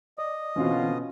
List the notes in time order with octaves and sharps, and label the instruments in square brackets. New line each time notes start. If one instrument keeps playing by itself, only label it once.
[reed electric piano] D5 [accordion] D#5 D#6
[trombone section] B2 D3 F4 [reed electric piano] E3 C4 F#4 [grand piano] C#4